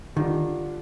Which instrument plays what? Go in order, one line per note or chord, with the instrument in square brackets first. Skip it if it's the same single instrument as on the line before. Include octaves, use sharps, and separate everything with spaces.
[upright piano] D3 G3 D4 F4 [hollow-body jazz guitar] D#3